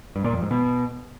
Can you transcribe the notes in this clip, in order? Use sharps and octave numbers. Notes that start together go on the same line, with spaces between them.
G2
A#2
F2
G#2
B2